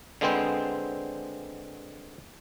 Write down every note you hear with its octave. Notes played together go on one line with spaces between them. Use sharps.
D3 G#3 B3 C4 C5